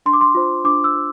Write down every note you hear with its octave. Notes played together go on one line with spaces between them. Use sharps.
D4 C6
D6
C6
F4 C5
D4 D6
E6
F4 C5